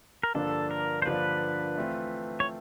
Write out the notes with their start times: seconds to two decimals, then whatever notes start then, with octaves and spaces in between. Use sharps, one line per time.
0.23 A#4
0.34 G2 D3 F3 A#3 D4 A4
0.71 A#4
1.02 C5
1.06 G2 D3 F3 A#3 D4 B4
1.77 E3 A3 C4 F4
2.40 C#5